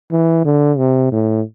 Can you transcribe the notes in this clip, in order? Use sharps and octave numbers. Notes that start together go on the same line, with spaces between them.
E3
D3
C3
A2